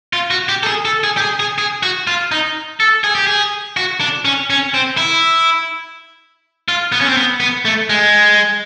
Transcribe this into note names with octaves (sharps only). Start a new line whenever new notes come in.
F4
F#4
G4
A4
G#4
A4
G#4
G4
G#4
G#4
G#4
F#4
F4
D#4
A4
G#4
G4
G#4
F#4
D4
C#4
C#4
C4
E4
F4
B3
C#4
C4
B3
B3
A3
G#3